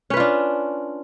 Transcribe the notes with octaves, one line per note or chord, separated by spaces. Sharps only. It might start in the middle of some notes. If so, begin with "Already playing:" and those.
C#4 D4 F4 B4